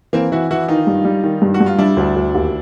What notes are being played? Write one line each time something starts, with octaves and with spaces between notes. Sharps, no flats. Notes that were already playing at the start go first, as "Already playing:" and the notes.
E3 A#3 C4
E3 E4 F#4
E3 E4 F#4
D#3 D#4 F4
G2
G3
D#3
G2
F#4
G2
F4
G3 D4 E4
D2
D2
D#2